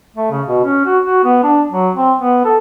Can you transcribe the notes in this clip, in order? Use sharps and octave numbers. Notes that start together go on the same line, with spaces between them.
A3
C#3
B2
C#4
F#4
F#4
B3
D4
F#3
C4
B3
A4